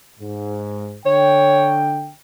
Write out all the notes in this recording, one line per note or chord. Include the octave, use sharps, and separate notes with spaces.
G#2
D3 C#5 G5